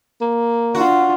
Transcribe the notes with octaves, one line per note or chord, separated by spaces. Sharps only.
A#3
D4 F4 F#4